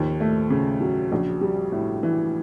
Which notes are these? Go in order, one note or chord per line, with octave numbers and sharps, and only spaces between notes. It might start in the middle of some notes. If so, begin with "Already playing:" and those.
Already playing: D#2 F3
A3
C#3
F#3
A#1
G3
A2
E3